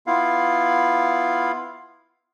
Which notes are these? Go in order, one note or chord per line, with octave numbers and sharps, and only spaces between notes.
B3 E4 F4 F5